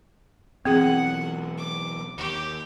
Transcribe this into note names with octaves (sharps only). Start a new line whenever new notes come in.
B2 E3 F#3 C4 G#4 F#5
D6
D#2 G4